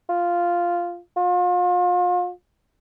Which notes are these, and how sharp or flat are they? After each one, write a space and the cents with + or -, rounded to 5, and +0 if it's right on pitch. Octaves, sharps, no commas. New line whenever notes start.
F4 -5
F4 +35